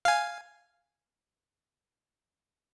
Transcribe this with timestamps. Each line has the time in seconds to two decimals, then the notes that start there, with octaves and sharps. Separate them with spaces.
0.05 F5 G#5